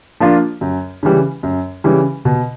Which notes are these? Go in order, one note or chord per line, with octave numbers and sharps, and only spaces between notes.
F3 A#3 D4 F4
F#2
C#3 E3 G3
F#2
C#3 E3 G3
B2